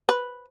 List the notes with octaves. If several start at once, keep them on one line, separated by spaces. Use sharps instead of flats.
B4